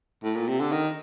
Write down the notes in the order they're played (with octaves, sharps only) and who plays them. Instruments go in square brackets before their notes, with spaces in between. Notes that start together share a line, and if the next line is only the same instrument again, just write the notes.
[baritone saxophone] A2
A#2
C3
D3
D#3